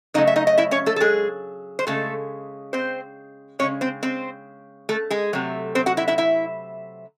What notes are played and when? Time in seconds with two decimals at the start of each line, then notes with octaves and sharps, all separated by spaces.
0.14 C#3 F#3 A3 D#4 D#5
0.27 E5
0.36 D#4 D#5
0.47 D#5
0.58 E4 E5
0.71 C#4 C#5
0.86 A3 A4
0.96 A4
1.00 G#3 G#4
1.79 C5
1.87 C#3 G#3 A3 A4
2.73 C4 C5
3.59 C#3 E3 G#3 C#4 C#5
3.81 C4 C5
4.03 C4 C5
4.89 A3 A4
5.11 G#3 G#4
5.33 C3 F#3 A3
5.75 C4 C5
5.86 F#4 F#5
5.97 E4 E5
6.08 E4 E5
6.18 E4 E5